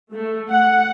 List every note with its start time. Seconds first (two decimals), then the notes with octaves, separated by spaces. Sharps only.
0.12 A3
0.50 F#5